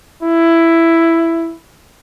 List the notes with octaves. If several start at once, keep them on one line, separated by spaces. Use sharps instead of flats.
E4